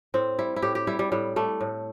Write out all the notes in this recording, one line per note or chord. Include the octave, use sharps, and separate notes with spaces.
A2 C4
G3 E4
E4
A2 G4
G4
G3 E4
G3
A2 G3
G3 A3
A2